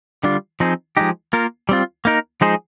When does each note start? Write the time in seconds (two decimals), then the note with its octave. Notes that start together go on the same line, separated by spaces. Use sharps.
0.23 D3 G3 D4 F4
0.60 F3 C4 D#4 G#4 C5
0.97 F3 G#3 D#4 G4
1.33 A#3 F4 A#4
1.69 G3 C4 F4
2.05 A#3 D#4 A#4
2.41 F3 G#3 D#4 G#4 C5